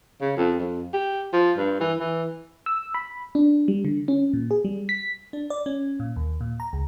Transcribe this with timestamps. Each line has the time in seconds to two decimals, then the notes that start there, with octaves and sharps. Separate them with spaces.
0.21 C#3
0.37 F2
0.59 F2
0.94 G4
1.33 F3
1.57 G2
1.80 E3
1.99 E3
2.66 E6
2.94 B5
3.35 D4
3.68 G3
3.85 D3
4.08 C#4
4.34 A#2
4.51 G#4
4.65 G3
4.89 B6
5.33 D4
5.50 D5
5.66 C#4
6.00 A#2
6.16 D#2
6.41 A#2
6.60 A#5
6.73 C#2